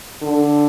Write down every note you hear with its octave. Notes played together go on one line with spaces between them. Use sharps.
D3